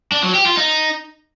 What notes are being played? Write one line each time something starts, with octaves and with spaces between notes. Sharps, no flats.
D4
F#3
G4
F4
D#4